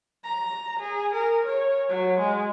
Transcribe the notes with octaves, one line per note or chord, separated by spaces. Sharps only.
A#5
G#4
A#4
C#5
F#3
G#3